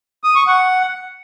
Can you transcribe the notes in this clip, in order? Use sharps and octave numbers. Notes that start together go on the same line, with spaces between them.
D#6
C#6
F#5